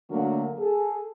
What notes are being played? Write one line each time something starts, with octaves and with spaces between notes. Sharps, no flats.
D3 F#3 A3 A#3 F#4 A#4
G#4 A4